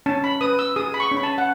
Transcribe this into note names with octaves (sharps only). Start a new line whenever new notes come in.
C#4 A5
B5
B4 D#6
E6
G#4 D#6
B5
C#6
C#4
B5
A5
F#5